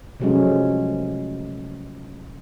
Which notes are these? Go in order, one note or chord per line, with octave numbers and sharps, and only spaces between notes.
C3 F3 F#3 G#3 A3 C#4